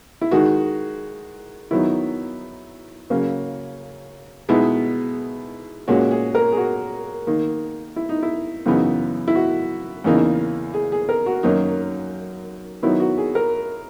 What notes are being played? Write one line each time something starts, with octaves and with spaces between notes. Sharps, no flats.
E4
D#3 G#3 D#4 F#4
D#3 F#3 B3 D#4 E4
C#3 F#3 A#3 C#4
B2 G#3 B3 D#4 E4
A#2 G#3 C#4 F#4
G#4
A#4
G#4
F#4
D#3 A#3 D#4
E4
D#4
E4
F#2 C#3 E3 B3 D#4
E4
F#4
E2 C#3 E3 A#3 D#4
G#4
G#4
A#4
F#4
F#2 D#3 F#3 A#3 D#4
D#3 F#3 B3 D#4 E4
F#4
G#4
A#4